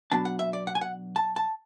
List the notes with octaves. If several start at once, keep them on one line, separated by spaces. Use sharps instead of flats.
B2 F#3 B3 D4 A5
F#5
E5
D5
F#5
G#5
F#5
A5
A5